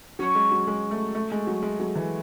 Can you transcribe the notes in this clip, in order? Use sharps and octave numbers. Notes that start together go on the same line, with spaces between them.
F#3 C#4 F#4 C#5
G#3
F#3
G#3
A3
A3
G#3
F#3
G#3
F#3
E3